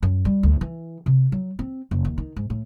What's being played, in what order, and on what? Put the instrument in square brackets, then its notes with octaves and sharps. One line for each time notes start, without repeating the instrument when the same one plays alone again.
[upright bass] F#2
G3
D2
E3
C3
F#3
C4
F#1
D#2
D#3
G#2
A2